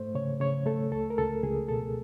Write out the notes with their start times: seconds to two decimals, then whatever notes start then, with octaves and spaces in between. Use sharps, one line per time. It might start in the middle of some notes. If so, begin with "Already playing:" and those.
Already playing: G#2 A3 C5
0.15 C#3 C#5
0.40 C#3 C#5
0.66 A3 A4
0.92 C#2 A4
1.10 A#4
1.18 C#2 A4
1.43 C#2 G#4
1.69 B2 A4